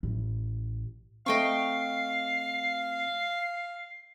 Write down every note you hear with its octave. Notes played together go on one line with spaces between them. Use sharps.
A1
A3 C4 D#5 F5 G5 C#6 C7